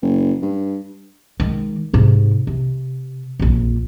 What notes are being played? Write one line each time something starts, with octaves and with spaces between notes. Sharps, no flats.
F#1
G2
D#3 G#3
G#2 C3
C3
A#1 F2